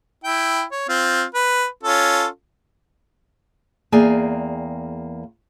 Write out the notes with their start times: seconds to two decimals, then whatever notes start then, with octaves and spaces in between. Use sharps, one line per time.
0.24 E4 G5
0.71 C#5
0.89 C4 F4
1.34 B4
1.83 C#4 F4 A4
3.92 E2 A#3 G#4 D5 G5 G#5